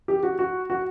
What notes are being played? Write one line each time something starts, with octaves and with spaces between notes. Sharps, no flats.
G4
F#4
F#4
F#4